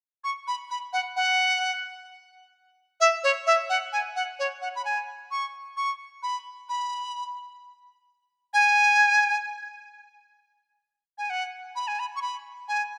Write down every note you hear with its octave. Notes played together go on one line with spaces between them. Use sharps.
C#6
B5
B5
F#5
F#5
E5
C#5
E5
F#5
G#5
F#5
C#5
F#5
B5
G#5
C#6
C#6
B5
B5
G#5
G#5
F#5
B5
G#5
B5
C#6
B5
G#5